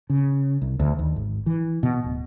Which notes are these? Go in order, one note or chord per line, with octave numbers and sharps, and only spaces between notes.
C#3
C2
D2
D#2
G#1
E3
B2
D1